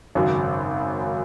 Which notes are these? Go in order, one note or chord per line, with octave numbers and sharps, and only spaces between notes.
G#1 F#2 C#3 F#3